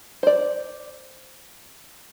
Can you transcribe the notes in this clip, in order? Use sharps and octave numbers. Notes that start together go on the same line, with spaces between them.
C5 D5